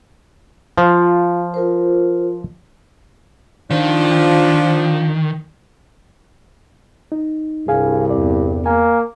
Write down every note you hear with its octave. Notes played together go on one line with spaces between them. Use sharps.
F3 F4 F5
F4 A#4 C5
D#3 F3 D4
D#4
C2 G2 G#4 F5 G#5
E2 D5
A#3 G#5